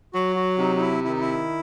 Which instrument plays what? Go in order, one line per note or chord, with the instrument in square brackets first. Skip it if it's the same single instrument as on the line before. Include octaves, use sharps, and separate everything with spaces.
[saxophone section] F#3 [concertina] F#4
[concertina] F#4
[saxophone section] C3 [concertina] D#4
[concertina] D#4
E4
[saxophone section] D#3 [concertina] E4
[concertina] D#4
E4